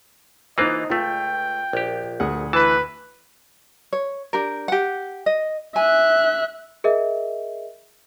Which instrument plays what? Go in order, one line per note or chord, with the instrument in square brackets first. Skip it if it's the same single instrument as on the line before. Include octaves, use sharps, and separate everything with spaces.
[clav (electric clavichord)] E3 A#3 F4 [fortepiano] D#4 C5 F#6 [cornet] D#5
[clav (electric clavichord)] C#2 A3 [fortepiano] F4 [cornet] G5
[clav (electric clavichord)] A#1 G4
[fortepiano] D2 G#4 F#5
[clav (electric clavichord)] E3 A5 [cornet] E4 [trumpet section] B4
[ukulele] C#5
D4 G4 A#4
G4 F#5
D#5
[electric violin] E5 F#6 [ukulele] G#5
[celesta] G#4 A#4 D#5 E5